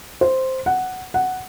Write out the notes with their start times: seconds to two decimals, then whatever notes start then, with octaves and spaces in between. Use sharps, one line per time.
0.21 C5
0.66 F#5
1.14 F#5